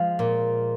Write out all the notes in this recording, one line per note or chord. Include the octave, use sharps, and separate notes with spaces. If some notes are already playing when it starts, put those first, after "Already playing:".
Already playing: F3 G#3
A#2